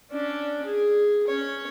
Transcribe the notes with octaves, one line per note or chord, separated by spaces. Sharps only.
C#4 D4
G#4
C#4 C#5